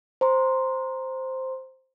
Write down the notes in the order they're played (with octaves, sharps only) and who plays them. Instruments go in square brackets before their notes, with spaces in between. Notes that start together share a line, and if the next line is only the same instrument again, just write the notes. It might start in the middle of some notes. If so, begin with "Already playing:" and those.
[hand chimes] C5 A#5 C6